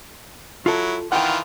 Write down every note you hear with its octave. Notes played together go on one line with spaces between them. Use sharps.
F#3 E4 F4 A4
D#3 E3 F4 F#5 G5